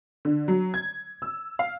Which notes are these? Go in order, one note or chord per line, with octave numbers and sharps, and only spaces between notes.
D3
F#3
G#6
E6
F5